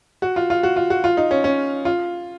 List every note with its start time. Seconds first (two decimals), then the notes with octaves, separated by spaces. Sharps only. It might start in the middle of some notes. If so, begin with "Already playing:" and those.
0.22 F#4
0.36 F4
0.50 F4
0.63 F#4
0.76 F4
0.90 F#4
1.04 F4
1.17 D#4
1.31 C#4
1.44 C#4
1.85 F4